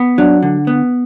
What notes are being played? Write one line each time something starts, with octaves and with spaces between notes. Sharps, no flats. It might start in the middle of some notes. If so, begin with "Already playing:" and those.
Already playing: B3
F#3 D4
D3
B3